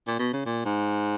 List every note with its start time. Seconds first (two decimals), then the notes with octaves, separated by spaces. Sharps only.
0.07 A#2
0.19 B2
0.33 C#3
0.46 A#2
0.65 G#2